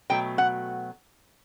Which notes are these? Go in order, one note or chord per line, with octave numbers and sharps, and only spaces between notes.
B2 F#3 A3 G5
F#5